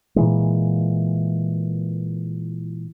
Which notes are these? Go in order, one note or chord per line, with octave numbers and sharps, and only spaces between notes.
A#2 E3 G#3